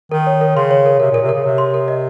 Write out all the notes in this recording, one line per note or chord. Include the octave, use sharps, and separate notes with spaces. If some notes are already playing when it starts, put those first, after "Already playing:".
D#3 A#4
C#5
A#4
C#3 C6
C#5
A#4
C3 A#4
A#2 A#4
C3
C#3 A#4
C3 C#5
C6
A#4
D#5